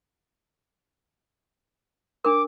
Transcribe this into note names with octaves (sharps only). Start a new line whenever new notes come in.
D4 A#4 D6